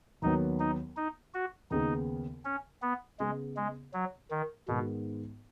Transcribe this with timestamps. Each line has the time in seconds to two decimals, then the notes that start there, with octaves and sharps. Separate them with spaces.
0.22 D#2 D#3 F#3 B3 D#4
0.60 D#4
0.97 D#4
1.34 F#4
1.71 D#2 C#3 B3 D#4 G#4
2.45 C#4
2.82 B3
3.20 C#3 G#3 B3 G#4
3.57 G#3
3.94 F#3
4.31 D#3
4.68 G#2 B2 D#3 G#3 B3